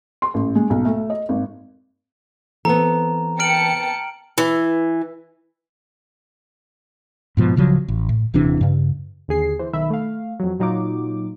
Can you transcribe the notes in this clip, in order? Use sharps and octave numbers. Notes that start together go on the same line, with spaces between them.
C6
A1
G#3
B1
A3
D#5
G#1
E3 B3 C4 A4 A#5
G5 A5 F6 C#7 D7 F#7
E3
G#2 B2 F3
D1 C#3 F3 F#3
A1
A2
D#1 C3 E3 D4
G2 C#3
D#2 D3 G#4 C7
E3 C5
B1 D#3 E5 B5
A3 F5
F2 F#3
A#2 F#3 D#4 F4 D6